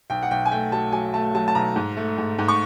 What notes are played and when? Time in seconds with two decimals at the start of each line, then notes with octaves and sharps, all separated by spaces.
0.10 B1 G5
0.22 F#5
0.31 B1 G5
0.45 G#5
0.51 A3 G5
0.72 F#3 A5
0.92 F#3 G#5
1.14 A3 A5
1.35 F#3 A5
1.48 A5
1.55 B1 A#5
1.76 G#2
1.97 A3
2.18 G#2
2.39 G#2
2.48 C#6